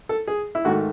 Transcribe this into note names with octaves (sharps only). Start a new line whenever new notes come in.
A4
G#4
E4
G#2 D#3 A3 F#4